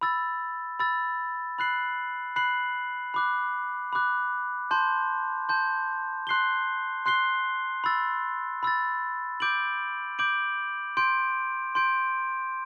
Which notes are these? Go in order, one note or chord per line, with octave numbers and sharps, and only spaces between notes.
B5 E6 A6
B5 E6 A6
B5 F#6 C7 F#7
B5 F#6 C7 F#7
B5 D6 F#6
B5 D6 F#6
A5 C6 G6
A5 C6 G6
C6 F#6 C7 G7
C6 F#6 C7 G7
B5 E6 A6
B5 E6 A6
D6 G6 D7 F#7
D6 G6 D7 F#7
C6 G6 D7
C6 G6 D7